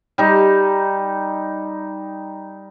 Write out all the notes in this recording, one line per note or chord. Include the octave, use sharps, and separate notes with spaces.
G3 D#4